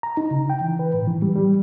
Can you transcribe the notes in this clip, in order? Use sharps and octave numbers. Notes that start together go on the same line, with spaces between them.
A#5
D#4
C#3
G5
E3
B4
A2
E3
G3
G3